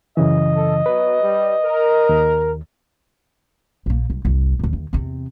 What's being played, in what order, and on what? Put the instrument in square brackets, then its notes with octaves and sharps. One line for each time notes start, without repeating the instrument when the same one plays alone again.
[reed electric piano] F#2 C#3 E3 [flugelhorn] D#5
[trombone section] A4
[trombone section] F#3 B3 [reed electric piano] B4
[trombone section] G3
A#4
[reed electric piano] D#2
[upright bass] A#1 A#3
C2
F#1 C2
A1 D2
D#2
E2 C3